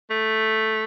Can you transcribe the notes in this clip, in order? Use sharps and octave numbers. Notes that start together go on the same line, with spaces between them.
A3